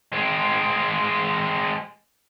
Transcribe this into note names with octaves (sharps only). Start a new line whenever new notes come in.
G#3 C4